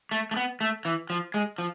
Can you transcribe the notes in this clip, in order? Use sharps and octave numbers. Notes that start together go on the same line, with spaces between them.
A3
A3
B3
A3
E3
F3
G#3
F3